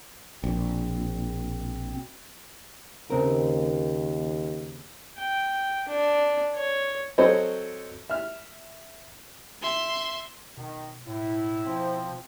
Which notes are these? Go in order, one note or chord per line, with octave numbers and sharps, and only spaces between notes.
A#1 B2 C4
D#2 C#3 C4 A#4
G5
D4
C#5
F#3 C4 A4 C5 C#5 D#5
E5 F6
E5 C6
B2 D#3
A2 E4
F3 C4